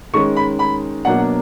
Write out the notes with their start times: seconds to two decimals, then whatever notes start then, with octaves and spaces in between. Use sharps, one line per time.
0.14 D#3 G#3 C#4 C#6
0.36 B5
0.59 B5
1.05 B2 F#3 A#3 D4 F#5